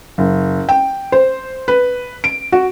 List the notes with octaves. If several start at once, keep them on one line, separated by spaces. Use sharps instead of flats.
F#1
G5
C5
B4
D7
F#4